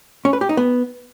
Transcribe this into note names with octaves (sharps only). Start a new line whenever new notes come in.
C#4
B4
G4
D#4
B3